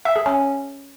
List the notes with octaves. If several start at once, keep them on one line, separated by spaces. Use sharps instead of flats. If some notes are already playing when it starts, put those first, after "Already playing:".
E5
G#4
C#4